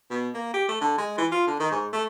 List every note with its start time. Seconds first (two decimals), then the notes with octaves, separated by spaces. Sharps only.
0.11 B2
0.34 A#3
0.54 G4
0.69 A3
0.81 D3
0.98 G#3
1.18 E3
1.31 F4
1.47 D3
1.60 D#3
1.71 G#2
1.93 A3